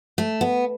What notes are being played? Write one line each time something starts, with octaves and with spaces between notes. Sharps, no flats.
A3
B3